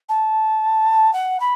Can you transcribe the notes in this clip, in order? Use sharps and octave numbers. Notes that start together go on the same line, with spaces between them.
A5
F#5
B5